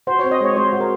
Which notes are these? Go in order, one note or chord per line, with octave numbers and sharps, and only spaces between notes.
F#4 C5
C4 C#5
D#5
G#3 C#5
G#3 C5
F#4
A#4